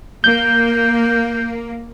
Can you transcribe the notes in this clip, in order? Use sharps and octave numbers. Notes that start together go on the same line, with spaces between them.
A#3 G6